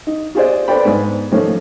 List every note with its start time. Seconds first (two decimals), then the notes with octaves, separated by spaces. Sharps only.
0.07 D#4
0.35 F4 G4 G#4 C5 D5 D#5
0.68 A4 B4 C5 D5 G5 B5
0.85 G#2 B3
1.32 D#3 F3 A3 A#3 C#4